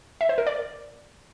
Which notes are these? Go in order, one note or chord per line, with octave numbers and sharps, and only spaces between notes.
E5
C5
A#4
D5